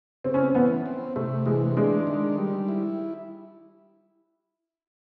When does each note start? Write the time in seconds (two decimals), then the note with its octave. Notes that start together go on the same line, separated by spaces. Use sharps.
0.24 C#3 C4
0.34 C#4
0.43 C4
0.54 E3 B3
0.86 C4
1.16 C3 A3
1.46 E3 G#3
1.77 G#3 D4
2.07 D#3
2.38 G3
2.68 E4